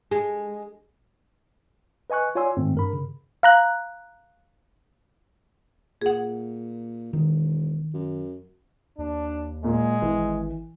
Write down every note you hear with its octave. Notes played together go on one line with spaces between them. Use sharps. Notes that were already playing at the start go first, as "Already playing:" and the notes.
G#3
B4 D#5 G#5 C#6 F#6
F4 C#5 D5 G#5 C6 E6
G#2 D#3 A3 C4
G2 A#4 B5
C#3
F5 A#5 F#6
A#2 G#4 F#5
E1 D#3
F#2
D#2 D4
A#2 G#3
G#1 E3